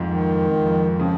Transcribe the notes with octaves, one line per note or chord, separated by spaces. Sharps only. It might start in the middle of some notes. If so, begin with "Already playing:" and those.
Already playing: F2 G#2
D#3
F2
C#3 F3